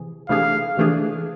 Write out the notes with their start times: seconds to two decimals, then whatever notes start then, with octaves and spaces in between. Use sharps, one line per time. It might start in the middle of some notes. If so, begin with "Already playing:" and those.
Already playing: C3 E3 G#4
0.29 C3 E3 A3 D4 G#4 F5
0.77 C3 E3 A3 D4 G#4